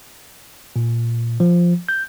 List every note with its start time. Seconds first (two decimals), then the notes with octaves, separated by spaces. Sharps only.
0.76 A#2
1.40 F3
1.89 G6